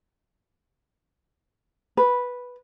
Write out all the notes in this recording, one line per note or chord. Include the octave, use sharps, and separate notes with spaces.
B4